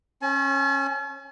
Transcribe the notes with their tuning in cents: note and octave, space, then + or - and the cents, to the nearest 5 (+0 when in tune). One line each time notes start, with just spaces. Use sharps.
C#4 -25 G#5 +45